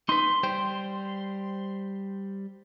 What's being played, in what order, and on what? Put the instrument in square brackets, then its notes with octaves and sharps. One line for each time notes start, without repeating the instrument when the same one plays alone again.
[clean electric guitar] D#4 B4 [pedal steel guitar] C6
[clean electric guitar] G3 C5 G5